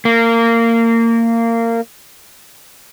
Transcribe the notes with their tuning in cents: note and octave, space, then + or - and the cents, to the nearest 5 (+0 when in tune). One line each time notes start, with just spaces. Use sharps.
A#3 -20